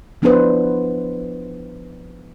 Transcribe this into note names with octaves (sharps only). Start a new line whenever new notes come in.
F3 B3 D4 E4 B4 C5